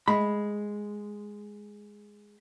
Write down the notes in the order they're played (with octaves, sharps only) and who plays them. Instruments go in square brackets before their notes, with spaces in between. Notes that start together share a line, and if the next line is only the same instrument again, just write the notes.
[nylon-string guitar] G#3 [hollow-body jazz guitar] B5